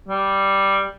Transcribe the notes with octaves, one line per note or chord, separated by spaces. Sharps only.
G3